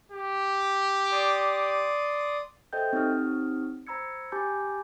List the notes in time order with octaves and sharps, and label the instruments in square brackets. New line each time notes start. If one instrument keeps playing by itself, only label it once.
[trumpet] G4
[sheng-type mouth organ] D5 C6 D#6
[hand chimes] A4 C5 D#5 E5 G5 G6
C4 D#4 G4 C#5 D#6 F6
C5 A#5 B5 E6 G#6 C#7
G4 G#5 A5 B5 D6 G6